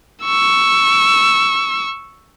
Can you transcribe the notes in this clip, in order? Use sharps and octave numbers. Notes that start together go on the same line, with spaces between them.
C#6 E6